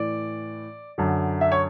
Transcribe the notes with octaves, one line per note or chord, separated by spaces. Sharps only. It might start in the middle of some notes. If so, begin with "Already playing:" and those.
Already playing: A2 E3 D5
F#2 D3
E5
C#5